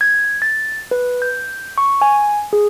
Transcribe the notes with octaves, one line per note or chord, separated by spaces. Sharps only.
G#6
A6
B4
G6
C#6
G#5
G#4